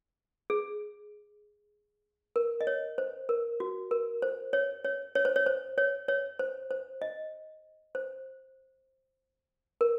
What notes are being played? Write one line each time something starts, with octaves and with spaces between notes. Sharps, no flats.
G#4
A#4
D#5
C#5
C5
A#4
F#4
A#4
C5
C#5
C#5
C#5
C5
C#5
C5
C#5
C#5
C5
C5
D#5
C5
A#4